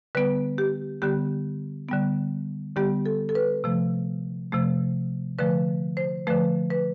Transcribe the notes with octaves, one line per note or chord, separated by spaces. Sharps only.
D3 G3 B3 B4
G4
D3 G3 B3 G4
D3 G3 B3
D3 G3 B3 G4
A4
A4
B4
C3 F3 A3
C3 F3 A3
D3 F3 A3 B4
C5
D3 F3 A3 B4
B4